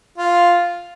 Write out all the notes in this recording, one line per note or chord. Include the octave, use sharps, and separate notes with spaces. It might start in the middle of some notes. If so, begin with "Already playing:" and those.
F4